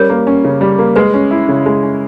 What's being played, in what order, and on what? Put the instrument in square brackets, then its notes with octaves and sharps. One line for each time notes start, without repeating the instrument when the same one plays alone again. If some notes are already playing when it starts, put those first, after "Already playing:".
Already playing: [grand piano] G3 C#4 [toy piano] A#4 C#5
[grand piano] A#3
C#4
C#3
G3
A#3
[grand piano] G#3 [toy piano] B4
[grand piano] C#4
E4
C#3
G#3
C#4